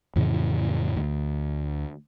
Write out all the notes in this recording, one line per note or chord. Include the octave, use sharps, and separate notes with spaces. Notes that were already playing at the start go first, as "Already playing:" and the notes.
F2 A2 C#3 E3
D2